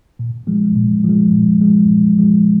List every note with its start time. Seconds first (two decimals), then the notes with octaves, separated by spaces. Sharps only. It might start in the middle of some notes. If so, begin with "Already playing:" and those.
0.19 A#2
0.47 F3 G#3
0.76 A#2
1.04 F3 G#3
1.33 A#2
1.61 F3 G#3
1.89 A#2
2.18 F3 G#3